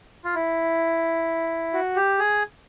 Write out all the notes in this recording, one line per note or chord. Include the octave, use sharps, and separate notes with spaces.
F4
E4
F#4
G4
G#4